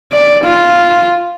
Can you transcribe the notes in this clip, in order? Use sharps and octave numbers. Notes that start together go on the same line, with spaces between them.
D5
F4